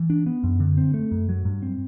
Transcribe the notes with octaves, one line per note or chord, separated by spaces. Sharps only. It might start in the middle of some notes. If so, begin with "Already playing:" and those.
Already playing: E3
D4
B3
F#2
D3
C4
A3
F#2
F#3
G2
C4